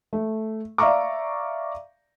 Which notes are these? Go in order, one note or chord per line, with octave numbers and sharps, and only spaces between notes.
A3
D5 E5 F5 A#5 C#6 D6